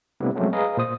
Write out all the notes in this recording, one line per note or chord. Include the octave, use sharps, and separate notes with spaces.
C3 G3 A3 B3 D4 E4
F3 F#3 G#3 A3 C4 C#4
G#4 B4 D#5 F5 A#5
A#2 C5 D#6